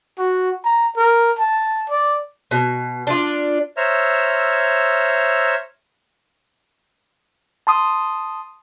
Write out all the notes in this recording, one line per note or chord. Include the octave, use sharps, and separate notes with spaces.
F#4
A#5
A#4
A5
D5
B2
D4 F4
C5 C#5 E5 A#5 E6 F6
A5 C6 D#6